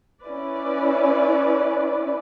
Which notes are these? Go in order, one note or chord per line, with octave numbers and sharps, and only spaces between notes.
C#4 E4 B4 D5